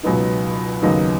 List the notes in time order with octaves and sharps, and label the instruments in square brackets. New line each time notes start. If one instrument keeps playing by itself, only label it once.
[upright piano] C#2 B2 F#3 B3 D#4
D#2 C#3 F#3 B3 D#4